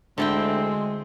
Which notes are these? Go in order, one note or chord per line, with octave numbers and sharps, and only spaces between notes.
D2 D3 G#3 C4 E4 G5